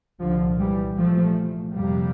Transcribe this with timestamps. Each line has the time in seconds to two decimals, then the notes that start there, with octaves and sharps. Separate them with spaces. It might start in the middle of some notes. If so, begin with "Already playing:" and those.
0.20 C2 A#2 D3 F3
0.59 E3 G3
0.97 C2 A#2 F3 A3
1.73 F2 C3 G3 A#3